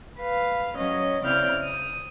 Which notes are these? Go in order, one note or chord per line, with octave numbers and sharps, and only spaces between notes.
B4 F5
F#3 C#4 D#5
C#3 C4 E4 D5 F6 G6
D#6